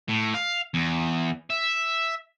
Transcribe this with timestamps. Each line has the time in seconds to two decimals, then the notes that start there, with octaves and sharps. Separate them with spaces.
0.08 A2
0.34 F5
0.74 E2
1.50 E5